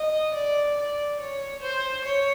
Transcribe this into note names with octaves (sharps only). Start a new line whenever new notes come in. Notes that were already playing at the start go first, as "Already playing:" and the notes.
Already playing: D#5
D5
D5
C#5
C5
C#5